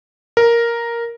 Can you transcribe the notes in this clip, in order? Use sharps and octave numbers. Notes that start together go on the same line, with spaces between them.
A#4